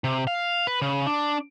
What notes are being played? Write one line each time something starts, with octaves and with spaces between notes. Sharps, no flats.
C3
F5
B4
C#3
D4